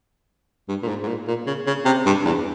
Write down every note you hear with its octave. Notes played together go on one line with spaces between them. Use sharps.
G2
A#2
G#2
G#2
A#2
A#2
C#3
C#3
C3
G2
E2